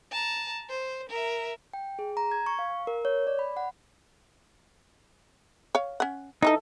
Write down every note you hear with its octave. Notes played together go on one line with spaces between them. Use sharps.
A5 A#5
C5
A#4 E5
G5
G#4
A#5
G#6
C#6
F5
A#4
C#5
D5
B5
F#5
C#5 F5
C#4 F#5
E3 D#4 E4 A4